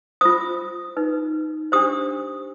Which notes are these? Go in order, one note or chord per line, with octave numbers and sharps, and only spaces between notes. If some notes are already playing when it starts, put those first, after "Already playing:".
F4 C5 D#6
D#4 B4
D4 G4 C5 D#6